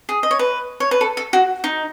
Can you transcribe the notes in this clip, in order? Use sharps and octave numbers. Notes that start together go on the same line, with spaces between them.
G#4
D#5
C#5
B4
C#5
B4
A4
A4
F#4
D#4